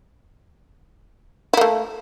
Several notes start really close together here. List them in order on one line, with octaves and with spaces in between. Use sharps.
E4 A#3 A3